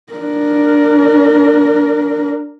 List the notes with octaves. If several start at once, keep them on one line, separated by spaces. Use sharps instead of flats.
D4 A#4